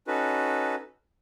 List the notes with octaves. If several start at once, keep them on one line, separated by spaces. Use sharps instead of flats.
C#4 D#4 F#4 A4 B4